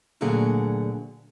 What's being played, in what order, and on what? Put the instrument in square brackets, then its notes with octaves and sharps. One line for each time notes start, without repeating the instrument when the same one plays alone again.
[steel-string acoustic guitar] D2 A#2 D3 F#3 G#4